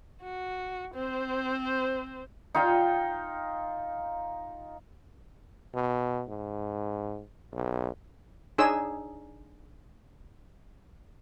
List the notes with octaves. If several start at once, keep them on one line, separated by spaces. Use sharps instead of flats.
F#4
C4 C5
D#4 F4 F5 G5
B2
G#2
B1
D4 D#4 G#4 C#5 E6